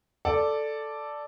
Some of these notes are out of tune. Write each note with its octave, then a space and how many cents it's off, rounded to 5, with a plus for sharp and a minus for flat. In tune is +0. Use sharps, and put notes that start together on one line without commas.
A4 +0 D5 +0